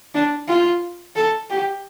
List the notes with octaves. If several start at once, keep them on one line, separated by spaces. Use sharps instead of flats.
D4
F4
A4
G4